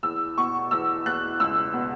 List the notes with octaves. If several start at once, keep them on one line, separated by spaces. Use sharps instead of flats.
E2 E6
B2 C#6
E2 E6
E2 F#6
C#2 E6
B2